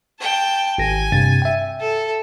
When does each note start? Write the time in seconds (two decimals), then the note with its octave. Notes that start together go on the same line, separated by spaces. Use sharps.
0.20 G5 A5
0.78 G#1 G#5 A#6
1.12 G2 C3 A6
1.42 E5 G5
1.80 A4